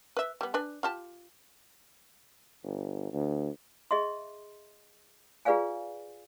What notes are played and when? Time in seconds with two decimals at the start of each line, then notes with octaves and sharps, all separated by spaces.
0.17 B4 E5
0.41 G3 B3
0.54 D4 B4 G#5
0.83 F4 G4 A5
2.63 G1
3.13 D2
3.91 G#4 D#5 E5 C6
5.45 F4 G#4 B4 D5 F5 G#5